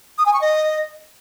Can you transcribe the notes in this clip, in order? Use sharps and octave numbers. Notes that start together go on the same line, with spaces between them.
D#6
G#5
C#6
D#5